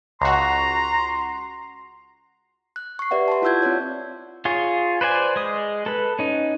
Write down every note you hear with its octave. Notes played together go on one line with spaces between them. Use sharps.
C#2 F#4 A#5 C6
F#6
C#6 C7
G4 B4 D5 E5 F#5
A5 C6
E4 F4 F#5 E6 G6 G#6
C4 F4 C#5 D5
F4 G#4 C#5
B4 C5 D5 G#5
G#3 D#6
A4 B4
C#4 D#4